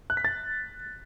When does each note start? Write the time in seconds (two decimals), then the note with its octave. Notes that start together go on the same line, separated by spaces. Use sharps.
0.10 F#6
0.17 B6
0.25 A6